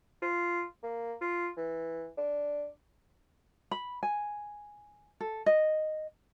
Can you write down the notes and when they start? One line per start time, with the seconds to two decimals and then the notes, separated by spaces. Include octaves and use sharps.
0.22 F4
0.83 A#3
1.21 F4
1.57 E3
2.17 D4
3.71 B5
4.03 G#5
5.20 A4
5.46 D#5